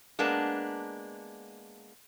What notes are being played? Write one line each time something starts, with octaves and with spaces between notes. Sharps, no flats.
G#3 A#3 B3 D4